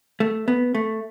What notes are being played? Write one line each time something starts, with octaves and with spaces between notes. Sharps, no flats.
A3
B3
A3